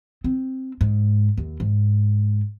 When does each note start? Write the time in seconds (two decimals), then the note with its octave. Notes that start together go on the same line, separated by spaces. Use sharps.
0.24 C4
0.81 G#2
1.37 D#2
1.60 G#2